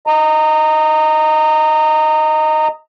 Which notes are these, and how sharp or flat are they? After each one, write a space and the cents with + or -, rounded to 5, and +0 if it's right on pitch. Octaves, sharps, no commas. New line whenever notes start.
D#5 +0 A#5 -20